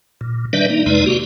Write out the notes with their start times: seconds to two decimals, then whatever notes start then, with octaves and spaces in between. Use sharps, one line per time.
0.21 A#2
0.53 D#3 G3 D4 B4 D5 E5
0.70 A#3 D#4
0.86 F2 C3 G#3 D#4 B4 D5
1.06 A#3 F#4 G4